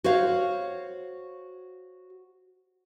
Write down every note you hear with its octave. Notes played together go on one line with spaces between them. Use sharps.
F#4 C5 C#5 F5